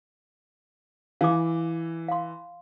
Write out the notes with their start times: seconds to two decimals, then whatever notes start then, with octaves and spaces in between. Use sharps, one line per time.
1.21 E3 F5 G#5 D6
2.08 F5 C6